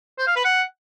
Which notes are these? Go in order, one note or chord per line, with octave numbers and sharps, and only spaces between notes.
C5
F5
B4
F#5